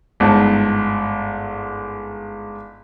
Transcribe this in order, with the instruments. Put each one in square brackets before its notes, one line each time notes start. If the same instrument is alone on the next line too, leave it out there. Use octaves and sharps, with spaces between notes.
[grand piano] G1 G#2 A5